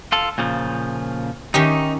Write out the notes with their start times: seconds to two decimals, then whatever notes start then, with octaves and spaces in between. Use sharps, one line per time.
0.12 F4 A4
0.38 A#2 C#3 F3
1.54 D#3 C#4 D#4 G4